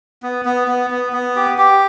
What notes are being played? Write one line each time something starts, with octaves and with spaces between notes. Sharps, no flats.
B3
B3
B3
B3
B3
G4
G4